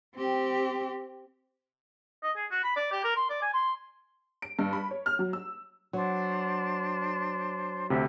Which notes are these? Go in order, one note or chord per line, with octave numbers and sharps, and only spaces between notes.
C4 G4
D#5
G#4
F#4
B5
D5
G4
A#4
C6
D5
G#5
C6
D7
G2
B5
C#5
F6
F#3
E6
F#3 D4 C5
D2 C3 G4 E5